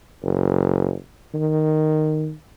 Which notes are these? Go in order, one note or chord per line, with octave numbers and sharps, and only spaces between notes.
F#1
D#3